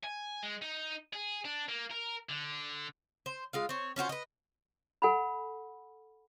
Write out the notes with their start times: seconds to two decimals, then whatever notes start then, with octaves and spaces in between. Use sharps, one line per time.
0.04 G#5
0.43 G#3
0.62 D#4
1.13 G#4
1.45 D4
1.69 A#3
1.91 A#4
2.29 D3
3.26 C5
3.53 G#3 F4 F5
3.69 C4 C#5
3.96 C#4 F4 F#4 C5
4.09 B4 D#5
5.02 A4 F#5 G#5 B5